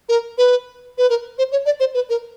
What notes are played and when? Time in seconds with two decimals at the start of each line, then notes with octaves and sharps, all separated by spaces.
0.09 A#4
0.38 B4
0.98 B4
1.10 A#4
1.38 C5
1.52 C#5
1.66 D5
1.80 C5
1.94 B4
2.10 A#4